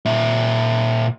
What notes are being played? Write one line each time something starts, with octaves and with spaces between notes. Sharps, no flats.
A#2 E5